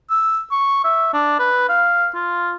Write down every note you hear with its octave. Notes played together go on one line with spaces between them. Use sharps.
E6
C#6
E5
D4
B4
F5
F4